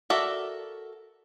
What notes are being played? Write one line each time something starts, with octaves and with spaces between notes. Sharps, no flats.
F#4 A4 A#4 D5 E5